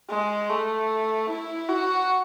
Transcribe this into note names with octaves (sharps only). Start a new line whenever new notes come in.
G#3
A3
E4
F#4